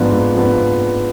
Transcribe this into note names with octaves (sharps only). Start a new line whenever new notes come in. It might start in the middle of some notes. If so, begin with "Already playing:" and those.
Already playing: G#2 F3 B3 D4
G#2
F3 B3 D4